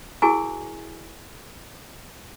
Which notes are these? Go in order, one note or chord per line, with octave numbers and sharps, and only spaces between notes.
E4 F#4 G#4 A#4 G#5 C#6